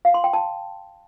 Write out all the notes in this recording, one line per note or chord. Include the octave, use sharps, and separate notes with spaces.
F5
C6
G5
A5